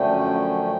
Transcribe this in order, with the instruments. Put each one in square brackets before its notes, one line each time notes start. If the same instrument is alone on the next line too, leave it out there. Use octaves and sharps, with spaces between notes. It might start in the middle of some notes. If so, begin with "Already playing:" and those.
Already playing: [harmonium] F#2 D3 F3 A3 C#4 G5